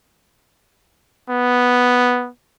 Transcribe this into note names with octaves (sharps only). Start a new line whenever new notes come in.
B3